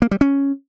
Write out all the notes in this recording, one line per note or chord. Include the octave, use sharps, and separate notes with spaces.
A#3
G3
C#4